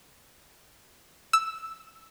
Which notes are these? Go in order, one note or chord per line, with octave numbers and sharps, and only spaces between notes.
E6